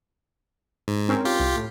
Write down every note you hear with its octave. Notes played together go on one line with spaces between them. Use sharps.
G#2
C4 C#4 A#4
F4 G4
C2
A2